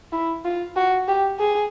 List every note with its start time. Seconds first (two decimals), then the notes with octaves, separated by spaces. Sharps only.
0.12 E4
0.45 F4
0.76 F#4
1.08 G4
1.39 G#4